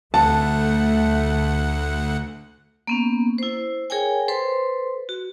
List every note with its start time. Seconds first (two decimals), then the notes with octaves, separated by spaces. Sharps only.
0.14 D2 A3 F#5 A5
2.87 A#3 B3 C#4
3.38 E4 C5
3.90 G#4 A#4 C#5 G5 G#5
4.28 A4 B4 C5 C6
5.09 F#4